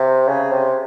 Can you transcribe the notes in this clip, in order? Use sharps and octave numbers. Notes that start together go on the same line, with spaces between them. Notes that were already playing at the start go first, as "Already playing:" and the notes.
Already playing: C3
C#3
C3